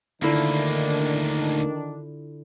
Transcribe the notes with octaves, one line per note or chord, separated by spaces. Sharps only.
D2 D3 D#3 A#3 D4 E4 F4